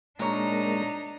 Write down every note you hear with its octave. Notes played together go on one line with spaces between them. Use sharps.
A#2 G#3 A#3 D4 D#4 C#5 A#5